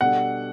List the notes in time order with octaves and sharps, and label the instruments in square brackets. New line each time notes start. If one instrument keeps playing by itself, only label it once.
[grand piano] B2 G3 D4 A4 [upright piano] F#5